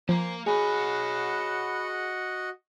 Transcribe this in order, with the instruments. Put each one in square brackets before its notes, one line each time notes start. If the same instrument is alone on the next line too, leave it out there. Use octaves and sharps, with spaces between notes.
[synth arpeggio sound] F3 [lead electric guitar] A#3 A#5 [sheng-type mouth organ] C5 G#5
[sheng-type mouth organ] F#4 D#5 F#5 [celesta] G#4 G#5 [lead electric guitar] C#5 B5